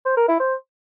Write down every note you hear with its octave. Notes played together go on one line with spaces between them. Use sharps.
C5
A#4
E4
C5